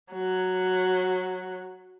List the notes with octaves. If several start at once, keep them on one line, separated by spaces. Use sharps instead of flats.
F#3